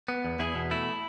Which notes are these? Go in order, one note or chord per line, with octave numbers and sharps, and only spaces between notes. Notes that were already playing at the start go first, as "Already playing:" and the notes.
B3
E2
E2 E4 G#4
B2
A3 E4